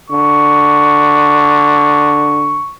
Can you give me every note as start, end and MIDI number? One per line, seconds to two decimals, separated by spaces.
0.10 2.62 50
0.10 2.75 85